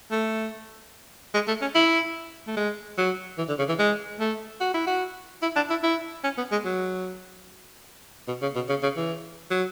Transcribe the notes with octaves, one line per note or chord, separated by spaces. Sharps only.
A3
G#3
A3
C#4
E4
A3
G#3
F#3
E3
D3
C#3
E3
G#3
A3
F#4
E4
F#4
E4
D4
E4
E4
C#4
B3
G#3
F#3
B2
C#3
B2
C#3
C#3
E3
F#3